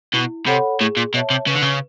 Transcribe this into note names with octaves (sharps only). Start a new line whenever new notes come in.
B2 E4
C3 A4 C#5 F#5 B5
A2 G#4
A#2
B2 C#5 E5 A5
C3
C#3 B4
D3
C#3